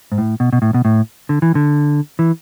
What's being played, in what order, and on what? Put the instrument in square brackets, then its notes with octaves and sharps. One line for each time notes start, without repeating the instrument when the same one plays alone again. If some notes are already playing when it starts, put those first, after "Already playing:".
[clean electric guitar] G#2
A2
B2
B2
A2
B2
A2
D3
E3
D3
E3